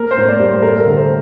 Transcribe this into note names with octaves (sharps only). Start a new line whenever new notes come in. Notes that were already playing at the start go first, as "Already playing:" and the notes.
Already playing: A#3 A#4
C5
A2
D5
G3
C5
A3 A#4
A#4
D3
C5